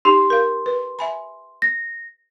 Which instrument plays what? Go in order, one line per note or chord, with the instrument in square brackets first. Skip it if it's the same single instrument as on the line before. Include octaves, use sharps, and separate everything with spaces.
[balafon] D#4 G4 [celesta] C6
[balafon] A#4 F5
B4
E5 G#5 B5
[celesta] A#6